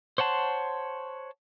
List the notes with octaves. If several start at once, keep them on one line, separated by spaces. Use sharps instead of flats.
C5 C#5 F#5 A5 C6